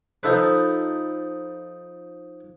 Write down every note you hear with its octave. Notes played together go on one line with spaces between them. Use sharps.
F3 D#4 A4 B4